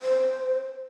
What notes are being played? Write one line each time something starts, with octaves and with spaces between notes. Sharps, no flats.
C5